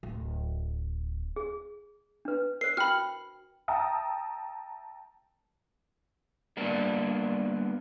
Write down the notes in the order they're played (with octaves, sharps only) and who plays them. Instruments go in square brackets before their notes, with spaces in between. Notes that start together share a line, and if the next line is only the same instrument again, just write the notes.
[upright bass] D1
[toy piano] G#4
D4 B4
[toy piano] A#4 C5 [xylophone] C7
[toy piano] F#4 G5 [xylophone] B5 F6
[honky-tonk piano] E5 G5 A5 A#5 D#6 E6
[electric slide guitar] G3 A#3 B3 D4